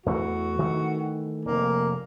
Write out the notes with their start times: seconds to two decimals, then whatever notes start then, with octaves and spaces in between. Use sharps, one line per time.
0.06 E2 E3 A3 F#4
0.59 D#3 E3 A3
1.45 F1 A#3